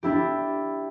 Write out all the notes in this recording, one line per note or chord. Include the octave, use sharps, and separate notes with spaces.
D4 E4 G4